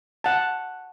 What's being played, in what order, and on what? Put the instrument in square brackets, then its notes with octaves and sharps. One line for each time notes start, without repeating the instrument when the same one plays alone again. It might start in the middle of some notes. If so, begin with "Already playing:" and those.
[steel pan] F#5 A5